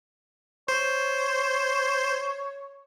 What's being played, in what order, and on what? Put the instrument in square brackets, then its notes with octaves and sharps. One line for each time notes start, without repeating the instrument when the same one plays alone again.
[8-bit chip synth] C5 [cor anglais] C#5